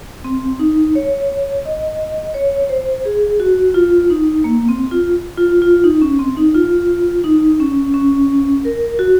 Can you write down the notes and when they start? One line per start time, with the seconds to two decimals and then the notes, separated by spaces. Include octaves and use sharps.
0.24 C4
0.59 D#4
0.95 C#5
1.65 D#5
2.34 C#5
2.69 C5
3.05 G#4
3.40 F#4
3.74 F4
4.10 D#4
4.44 A#3
4.68 C4
4.91 F4
5.37 F4
5.62 F4
5.84 D#4
6.02 C#4
6.19 C4
6.37 D#4
6.55 F4
7.24 D#4
7.60 C#4
7.94 C#4
8.65 A#4
8.99 F#4